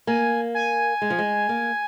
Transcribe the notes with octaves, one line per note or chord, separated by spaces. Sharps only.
A#3 G#5
G#5
G#3
F3
G#3
A#3